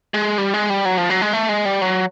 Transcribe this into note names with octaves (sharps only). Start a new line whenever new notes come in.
G#3
G3
G#3
G3
F#3
F3
F#3
G#3
A3
G#3
G3
F#3